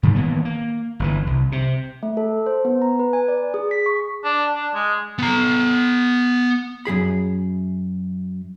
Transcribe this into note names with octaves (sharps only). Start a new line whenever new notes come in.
G#2 D#3 G3
D#3 E3 A#3 B3
A#3
G1 B2 E3
C2
C3
A3
A4
C5
B3
A#5
B4
G#5
D5
G#4
B6
C#6
D4
D4
G#3
B3 A#5
F#2 C3 G#4 B5